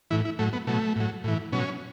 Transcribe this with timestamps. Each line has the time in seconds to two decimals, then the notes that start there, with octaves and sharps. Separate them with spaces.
0.11 A2 E3 E4
0.25 E4
0.39 A2 F#3 A3
0.53 B3
0.67 B2 F#3 A3
0.96 A2 F#3
1.24 A2 E3
1.53 B2 F#3 C#4